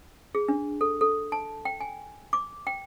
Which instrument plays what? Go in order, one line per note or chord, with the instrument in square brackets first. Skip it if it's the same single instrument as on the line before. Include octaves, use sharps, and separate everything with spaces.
[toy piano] G#4
D4
A4
A4
A5
G5
G#5
D6
G5